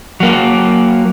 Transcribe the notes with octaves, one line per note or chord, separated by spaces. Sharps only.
F#3 A#3